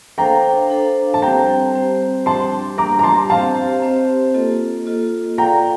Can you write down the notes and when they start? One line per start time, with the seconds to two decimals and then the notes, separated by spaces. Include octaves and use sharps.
0.18 D4 A4 C5 F5 G5 A#5
0.70 D4 A4 C5 F5
1.14 A5
1.22 G3 C4 G4 C5 G5 A#5
1.74 G3 C4 G4 C5
2.26 G3 D4 G4 A5 C6
2.78 G3 D4 G4 A#5 D6
2.99 A#5
3.03 A5 C6
3.30 C4 G4 C5 D#5 F5 A5
3.82 C4 G4 C5 D#5
4.34 A#3 F4 A4 D#5
4.86 A#3 F4 A4 D#5
5.38 F4 A4 D5 F5 G5 A#5